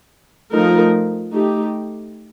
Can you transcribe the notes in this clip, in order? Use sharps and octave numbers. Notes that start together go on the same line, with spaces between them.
F3 A3 D#4 A#4
A3 D#4 G4